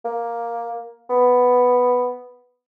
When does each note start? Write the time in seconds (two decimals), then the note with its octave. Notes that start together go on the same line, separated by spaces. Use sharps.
0.05 A#3
1.10 B3